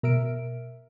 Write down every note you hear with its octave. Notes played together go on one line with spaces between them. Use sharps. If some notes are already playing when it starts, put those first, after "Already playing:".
B2 A#4 E5 F6 D7